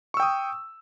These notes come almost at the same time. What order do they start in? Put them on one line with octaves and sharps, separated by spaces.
C#6 E6 G5 D#6